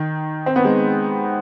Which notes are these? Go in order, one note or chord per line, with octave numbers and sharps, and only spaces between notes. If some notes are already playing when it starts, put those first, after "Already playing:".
Already playing: D#3
C4
B3
G#3